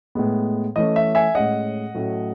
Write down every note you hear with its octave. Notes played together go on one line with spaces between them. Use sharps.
A2 G#3 B3
E3 A3 C#4 D#5
E5
E5 G#5
A2 G#3 C#4 D#5 F#5
A2 F#3 A3 C#4